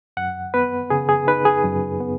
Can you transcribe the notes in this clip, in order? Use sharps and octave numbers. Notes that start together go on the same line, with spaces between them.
F#2 F#5
B3 B4
C#3 G#4
G#4
D#4 B4
G#4
F#2
B3